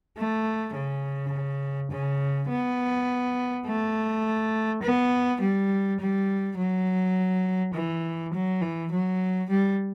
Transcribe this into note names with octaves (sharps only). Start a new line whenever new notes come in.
A3
C#3
C#3
B3
A3
B3
G3
G3
F#3
E3
F#3
E3
F#3
G3